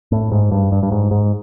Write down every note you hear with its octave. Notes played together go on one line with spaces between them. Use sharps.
A2
G#2
G2
G2
G2
G#2
G#2